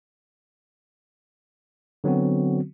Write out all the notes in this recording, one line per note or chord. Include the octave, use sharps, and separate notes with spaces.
D3 F#3 B3 C4 F#4